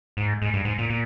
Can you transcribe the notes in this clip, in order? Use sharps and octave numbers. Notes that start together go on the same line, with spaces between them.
G#2
G#2
G2
G#2
A#2
A#2